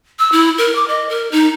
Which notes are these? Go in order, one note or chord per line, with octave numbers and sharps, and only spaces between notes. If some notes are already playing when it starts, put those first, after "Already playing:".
E6
E4
A#4
D6
D#5
A#4
D#4